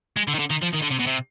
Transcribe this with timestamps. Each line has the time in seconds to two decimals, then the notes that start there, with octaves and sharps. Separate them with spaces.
0.17 G#3
0.28 D3
0.34 D#3
0.39 D3
0.50 D#3
0.62 F3
0.73 D#3
0.82 D3
0.90 C3
0.99 B2
1.06 C3